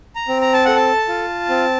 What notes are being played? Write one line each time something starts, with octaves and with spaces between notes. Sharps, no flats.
A#5
C4
A#5
A5
A4 F#5
A5
F4
C4